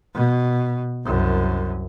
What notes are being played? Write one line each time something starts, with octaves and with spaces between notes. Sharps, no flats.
B2
C2 F#2